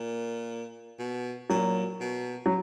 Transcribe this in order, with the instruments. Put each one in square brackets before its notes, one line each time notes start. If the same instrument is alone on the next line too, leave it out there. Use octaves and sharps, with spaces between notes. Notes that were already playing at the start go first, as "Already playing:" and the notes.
Already playing: [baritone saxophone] A#2
B2
[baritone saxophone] A#2 [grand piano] F#3
[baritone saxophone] B2
[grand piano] F#3